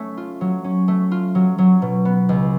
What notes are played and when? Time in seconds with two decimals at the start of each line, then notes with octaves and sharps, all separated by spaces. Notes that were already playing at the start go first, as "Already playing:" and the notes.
Already playing: A3 C#4
0.17 F4
0.41 F#3
0.64 C#4
0.88 A3
1.11 F4
1.35 F#3
1.58 F#3
1.82 B2
2.05 B3
2.29 C#2